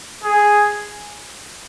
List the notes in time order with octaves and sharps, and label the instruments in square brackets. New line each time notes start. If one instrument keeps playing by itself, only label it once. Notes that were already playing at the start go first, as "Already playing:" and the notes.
[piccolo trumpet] G#4